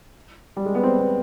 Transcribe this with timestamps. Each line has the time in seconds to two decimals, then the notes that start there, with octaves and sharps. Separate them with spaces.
0.57 G3
0.66 G#3
0.75 B3
0.83 C4
0.99 B3